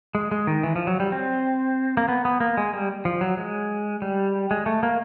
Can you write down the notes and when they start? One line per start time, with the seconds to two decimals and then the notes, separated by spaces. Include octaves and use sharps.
0.15 G#3
0.31 G#3
0.47 D#3
0.63 E3
0.76 F3
0.87 F#3
1.00 G3
1.12 C4
1.97 A#3
2.09 B3
2.25 B3
2.40 A#3
2.57 G#3
2.73 G3
3.05 F3
3.21 F#3
3.38 G#3
4.02 G3
4.51 G#3
4.66 A3
4.83 A#3